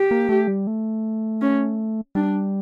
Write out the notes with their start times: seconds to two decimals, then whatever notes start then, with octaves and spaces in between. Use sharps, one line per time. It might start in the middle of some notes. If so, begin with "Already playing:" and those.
Already playing: G4
0.11 A#3
0.29 A3
0.48 G3
0.67 A3
1.42 C#4
2.15 G3 D4